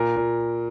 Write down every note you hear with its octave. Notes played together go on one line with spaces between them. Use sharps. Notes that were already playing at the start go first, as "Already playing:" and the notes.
Already playing: A#2 A#4
A#2